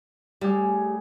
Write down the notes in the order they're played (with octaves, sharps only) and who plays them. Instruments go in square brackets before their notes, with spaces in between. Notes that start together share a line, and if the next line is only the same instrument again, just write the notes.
[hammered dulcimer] A2 G#4 [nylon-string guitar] G3